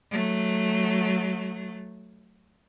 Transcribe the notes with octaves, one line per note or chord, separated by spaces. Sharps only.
F#3 A3